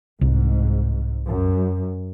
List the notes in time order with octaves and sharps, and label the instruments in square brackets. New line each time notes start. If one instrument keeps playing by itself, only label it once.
[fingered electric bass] C2 [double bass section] G#2
[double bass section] F#2